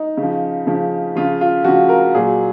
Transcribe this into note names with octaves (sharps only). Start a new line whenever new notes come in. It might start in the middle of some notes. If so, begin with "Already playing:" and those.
Already playing: D#4
C#3
F3
C#3 F3
C#3 F3 F4
F4
C#3 F3 F#4
A#4
A#2 F#3 G#4